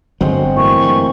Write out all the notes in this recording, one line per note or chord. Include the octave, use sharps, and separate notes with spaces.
G1 D3 F#3 G#3 C4 F#4 C5
A2 E3 A#3 C#6
G2